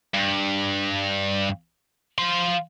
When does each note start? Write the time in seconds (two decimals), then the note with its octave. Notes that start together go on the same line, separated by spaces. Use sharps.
0.14 G2
2.18 F3 C6